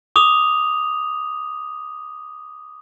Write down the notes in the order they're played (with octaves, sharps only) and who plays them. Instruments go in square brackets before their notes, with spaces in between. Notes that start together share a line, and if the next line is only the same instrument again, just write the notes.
[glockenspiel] D6 D#6 F7